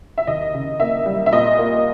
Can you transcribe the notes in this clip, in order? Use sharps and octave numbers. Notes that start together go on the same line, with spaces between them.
E5
D#2 D#5
C#3
A#3 E5
G3
E5
A#2 D#5
A#3